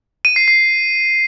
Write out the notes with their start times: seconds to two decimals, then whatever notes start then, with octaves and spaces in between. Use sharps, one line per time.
0.25 D#7
0.36 C7
0.48 C7